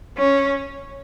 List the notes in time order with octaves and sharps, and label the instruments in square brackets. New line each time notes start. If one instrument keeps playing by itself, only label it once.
[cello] C#4